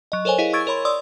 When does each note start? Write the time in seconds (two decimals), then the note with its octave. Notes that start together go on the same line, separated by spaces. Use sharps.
0.12 F#3 D#5
0.25 A4 A#4 C5 C#5 G#5
0.38 E4 G#4 A#4 D#5 F5
0.53 C#6 E6 G#6 A6 D7
0.67 A#4 C#5 B5 C6
0.85 D5 C6 D#6 E6